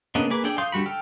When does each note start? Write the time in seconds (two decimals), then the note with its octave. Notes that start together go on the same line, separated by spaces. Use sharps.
0.15 C#3 A#3 B3 D4 D#5
0.30 A#3 G#4 B4 D6
0.44 D4 G#4 A4 D5 G5
0.58 F5 C6 D#6 G6
0.72 D3 G3 F#4 B5
0.86 A4 G5 F6